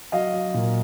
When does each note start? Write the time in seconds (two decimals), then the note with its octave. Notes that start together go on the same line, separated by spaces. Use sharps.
0.12 F#3 D#5 F5
0.34 F#3
0.54 A#2